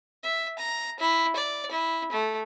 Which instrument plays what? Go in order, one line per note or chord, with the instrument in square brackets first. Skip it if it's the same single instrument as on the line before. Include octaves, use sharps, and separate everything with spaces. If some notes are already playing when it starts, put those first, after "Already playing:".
[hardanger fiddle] E5
A#5
E4
D5
E4
A3